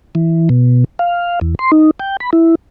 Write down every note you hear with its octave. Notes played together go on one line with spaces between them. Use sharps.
E3
B2
F5
E2
C6
D#4
G5
B5
E4